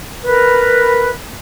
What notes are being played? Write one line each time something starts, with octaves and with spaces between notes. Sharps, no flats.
A#4 B4